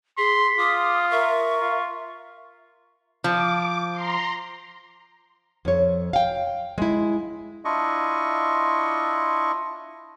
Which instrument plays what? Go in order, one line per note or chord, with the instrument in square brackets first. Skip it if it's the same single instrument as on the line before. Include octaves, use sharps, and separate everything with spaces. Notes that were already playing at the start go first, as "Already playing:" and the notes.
[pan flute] G#4 [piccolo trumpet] C6 [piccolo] B6
[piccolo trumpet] F4 [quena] D6 [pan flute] D#6
[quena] A#4 [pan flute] E5 [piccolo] C#6
[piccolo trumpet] F4
[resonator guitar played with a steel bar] F3 [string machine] D6
[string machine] A#5 C6
[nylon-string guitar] F2 C#5
F5 G5
G#3 E4
[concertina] D4 E4 F4 D#5 C#6